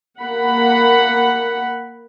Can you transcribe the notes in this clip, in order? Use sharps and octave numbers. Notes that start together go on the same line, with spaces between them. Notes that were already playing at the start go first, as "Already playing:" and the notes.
A#3 F#5 B5